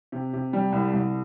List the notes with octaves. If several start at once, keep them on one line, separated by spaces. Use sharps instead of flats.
C3
C3
G3
C2
C2